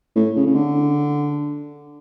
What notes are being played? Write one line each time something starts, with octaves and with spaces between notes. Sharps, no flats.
A2
C#3
C#3
D3